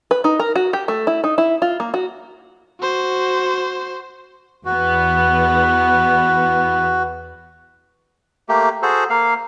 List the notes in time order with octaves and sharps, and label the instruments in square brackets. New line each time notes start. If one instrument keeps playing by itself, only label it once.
[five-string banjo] B4
D#4
A#4
F#4
G4
A3
E4
D#4
E4
F4
A#3
F#4
[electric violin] F#4 C5
[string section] E2 B3 [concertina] F#4
[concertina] A3 A#3 G4
F#4 G#4 A4 C5
A#3 F5